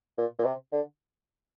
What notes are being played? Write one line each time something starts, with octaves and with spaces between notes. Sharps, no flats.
A#2
A#2
C3
D3